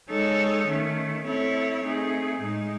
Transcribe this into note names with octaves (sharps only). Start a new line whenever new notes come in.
G#3 D#4 A4 C#5
D#3 A3 C#4
A3 C4 E4 A4 C#5
A3 C4 D#4 G#4
A2 G#3 D#4